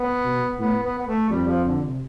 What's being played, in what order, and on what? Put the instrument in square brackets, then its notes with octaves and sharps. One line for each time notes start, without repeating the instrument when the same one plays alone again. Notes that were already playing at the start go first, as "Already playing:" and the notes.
Already playing: [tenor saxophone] B3
[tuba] B2
[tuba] A2 [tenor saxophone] B3
[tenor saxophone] B3
B3
A3
[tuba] F2 [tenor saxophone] G3
[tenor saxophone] F3
D3
C3